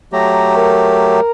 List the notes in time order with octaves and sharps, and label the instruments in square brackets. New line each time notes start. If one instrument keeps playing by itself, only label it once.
[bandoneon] F#3 A3 G4 [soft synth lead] A#5
[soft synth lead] A#4